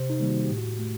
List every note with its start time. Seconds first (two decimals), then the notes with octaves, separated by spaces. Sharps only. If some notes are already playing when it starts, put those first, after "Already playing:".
Already playing: C3 C5
0.10 D#4
0.20 D#3 G3 A#3
0.30 F#4
0.43 G4
0.50 A2
0.58 F#4
0.79 A3